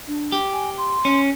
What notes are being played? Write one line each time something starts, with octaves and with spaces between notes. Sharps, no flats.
D4
G4
G#5
C6
C#4